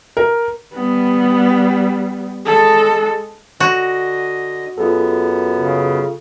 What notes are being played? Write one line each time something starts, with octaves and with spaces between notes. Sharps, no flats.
A#4
G3 B3
G#3 A4
D3 F#4 D#5
F#2 B3 F4 G#4 A4
C#3